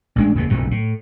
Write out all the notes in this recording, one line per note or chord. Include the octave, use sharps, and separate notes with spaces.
A1 G#3 D4
F#1 D#2 G#2
F#1 B1 F2 G#2
A2